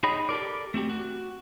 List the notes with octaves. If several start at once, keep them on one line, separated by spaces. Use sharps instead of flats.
D#4 G#4 C#5 D#5 G5 B5
G4 A4 A#4 D5
A3 C4 F#4 G4
F#4